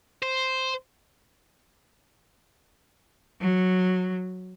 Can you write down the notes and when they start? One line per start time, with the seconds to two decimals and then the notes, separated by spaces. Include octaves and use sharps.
0.22 C5
3.41 F#3